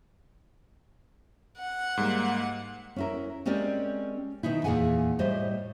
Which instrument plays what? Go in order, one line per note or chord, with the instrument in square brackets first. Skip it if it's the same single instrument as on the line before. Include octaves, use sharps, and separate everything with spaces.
[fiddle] F#5
[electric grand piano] G#2 G3 A#3
[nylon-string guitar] C#4 E4 A#4
G#3 C4 C#4 G4 A#4 D5
B2 D#3 D#4 E4
E2 G2 A#2 G#4 F#5 G#5
A2 G3 C5 D#5